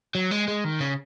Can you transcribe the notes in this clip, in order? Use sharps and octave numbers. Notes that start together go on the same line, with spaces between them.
F#3
G#3
G#3
D#3
C#3